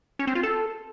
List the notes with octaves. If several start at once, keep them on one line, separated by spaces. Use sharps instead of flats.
C#4
C4
F4
A4